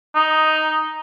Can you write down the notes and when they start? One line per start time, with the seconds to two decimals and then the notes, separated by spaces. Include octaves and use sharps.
0.15 D#4